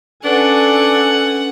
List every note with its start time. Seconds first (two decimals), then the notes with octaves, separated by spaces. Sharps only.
0.24 C#4 D4 A4 B4 F#5 G#5